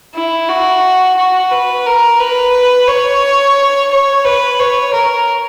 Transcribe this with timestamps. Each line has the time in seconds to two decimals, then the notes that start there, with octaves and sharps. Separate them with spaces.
0.14 E4
0.49 F#4
1.17 F#4
1.50 B4
1.86 A#4
2.19 B4
2.87 C#5
3.91 C#5
4.25 B4
4.59 C#5
4.93 A#4